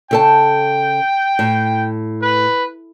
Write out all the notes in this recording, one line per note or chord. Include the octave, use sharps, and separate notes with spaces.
C#3 A4 G5 A5
A2
B4